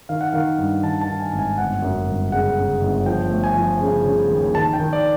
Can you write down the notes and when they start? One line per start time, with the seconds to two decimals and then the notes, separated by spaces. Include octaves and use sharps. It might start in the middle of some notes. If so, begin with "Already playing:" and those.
0.09 D#3 F5
0.21 F#5
0.33 D#3 F5
0.58 G2
0.83 D#3 A5
1.01 A5
1.08 D#3
1.20 G#5
1.33 G#1
1.39 G#5
1.58 G1 F#5
1.82 F#2
2.07 G1
2.32 C#3 F#5
2.56 C#3
2.81 G1
3.06 F3 G5
3.31 A3
3.44 G#5
3.55 F3
3.81 C#3
4.05 C#3
4.30 D#2
4.55 D#3 A5
4.73 G5
4.80 D#3
4.93 D5